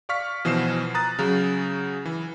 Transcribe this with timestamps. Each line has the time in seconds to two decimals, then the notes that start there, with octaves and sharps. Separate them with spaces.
0.09 D5 F5 C#6 F6 B6
0.45 B2 E3 F3 C5 C7 E7
0.95 A#5 D#6 F#6 A6
1.19 C#3 F#3 G#4
2.05 E3